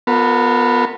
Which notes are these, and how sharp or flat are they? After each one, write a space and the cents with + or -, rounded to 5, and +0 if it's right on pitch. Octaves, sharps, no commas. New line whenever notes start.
B3 +0 F4 +35 A#4 -35